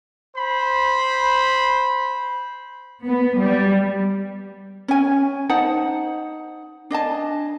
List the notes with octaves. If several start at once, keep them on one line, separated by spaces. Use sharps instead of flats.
C5 B5
B3
G3
C#4 G#5
D#4 C5 F#5 A5
D4 D#5 G#5 A5